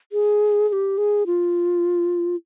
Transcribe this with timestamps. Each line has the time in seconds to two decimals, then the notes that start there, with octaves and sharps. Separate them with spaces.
0.12 G#4
0.68 G#4
0.73 G4
0.98 G#4
1.26 F4